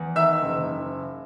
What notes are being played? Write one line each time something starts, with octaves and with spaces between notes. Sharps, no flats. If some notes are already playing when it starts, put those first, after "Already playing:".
Already playing: E2
D#3 E5 E6
F#1